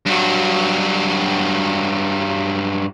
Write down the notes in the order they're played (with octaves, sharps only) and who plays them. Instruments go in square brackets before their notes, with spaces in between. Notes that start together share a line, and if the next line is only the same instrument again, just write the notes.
[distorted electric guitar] G2 F#3